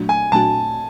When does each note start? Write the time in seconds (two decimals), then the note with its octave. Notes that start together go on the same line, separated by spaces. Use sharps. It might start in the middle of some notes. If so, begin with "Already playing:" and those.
Already playing: A#2 F#3 A3 D4 F#4
0.09 G#5
0.32 A#2 F#3 A3 D4 F#4 A5